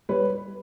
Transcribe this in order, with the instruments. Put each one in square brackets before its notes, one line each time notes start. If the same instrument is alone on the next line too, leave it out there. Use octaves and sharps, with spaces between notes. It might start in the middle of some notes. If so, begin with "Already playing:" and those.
[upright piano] G3 B4 C#5